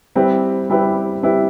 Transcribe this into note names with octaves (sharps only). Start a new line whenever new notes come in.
G3 C4 E4 G4 B4
G3 C4 E4 G4 B4
G3 C4 E4 G4 B4